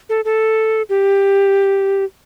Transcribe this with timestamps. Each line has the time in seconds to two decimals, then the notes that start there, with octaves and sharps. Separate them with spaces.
0.09 A4
0.25 A4
0.89 G4